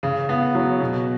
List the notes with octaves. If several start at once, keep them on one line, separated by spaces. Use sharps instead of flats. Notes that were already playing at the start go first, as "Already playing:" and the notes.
C#3
B3
F#3
B2